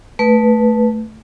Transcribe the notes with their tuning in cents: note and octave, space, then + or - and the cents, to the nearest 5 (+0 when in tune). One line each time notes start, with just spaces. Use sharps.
A3 +0 B4 -10